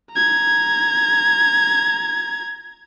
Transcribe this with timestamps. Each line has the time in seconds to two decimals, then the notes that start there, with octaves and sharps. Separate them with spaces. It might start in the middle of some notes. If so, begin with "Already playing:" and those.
0.13 A#5 G#6